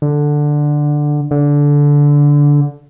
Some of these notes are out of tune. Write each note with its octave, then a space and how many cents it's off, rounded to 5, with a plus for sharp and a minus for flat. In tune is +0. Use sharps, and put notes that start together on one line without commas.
D3 +5
D3 -15